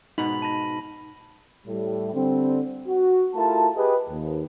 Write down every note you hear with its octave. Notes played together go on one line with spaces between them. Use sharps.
G#2 B2 D#4 F#5 B5 B6 F#7
A5 B5 A#6
A2 G3
D3 G3 C4
F#4
A3 E4 F4 G4 A#4 A5
G4 G#4 B4 D#5
D#2